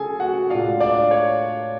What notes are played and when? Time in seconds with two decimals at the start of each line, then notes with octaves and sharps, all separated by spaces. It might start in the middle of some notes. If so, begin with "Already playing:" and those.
Already playing: C#3 F#3 A3 C#4 G#4 A4 G#5
0.20 F#4 F#5
0.50 A2 G#3 D4 F4 F5
0.80 D4 D5
1.11 C#5